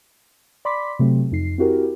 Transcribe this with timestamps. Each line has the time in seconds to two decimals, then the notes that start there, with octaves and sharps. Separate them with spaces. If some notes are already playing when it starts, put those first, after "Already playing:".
0.65 D5 B5 C6 D6 B6
0.99 C3 F#3 A3 C4
1.32 F2 D#4 C7
1.58 C4 E4 F#4 G4 A#4